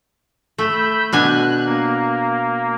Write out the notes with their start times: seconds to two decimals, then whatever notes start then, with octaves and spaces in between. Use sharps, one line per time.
0.58 A3 B5 E6 G6
1.12 B2 D4 G#5 F#6
1.65 A#3